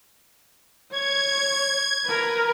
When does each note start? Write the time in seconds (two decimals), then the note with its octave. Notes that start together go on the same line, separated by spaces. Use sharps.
0.92 C#5 G#6
2.06 A#4 B4